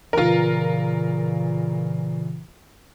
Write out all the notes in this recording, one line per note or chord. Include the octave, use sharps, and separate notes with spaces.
A#2 C#3 E3 F4 A#4